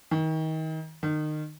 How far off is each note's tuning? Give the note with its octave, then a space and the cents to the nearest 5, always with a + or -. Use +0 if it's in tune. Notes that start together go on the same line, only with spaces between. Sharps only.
D#3 +30
D#3 -30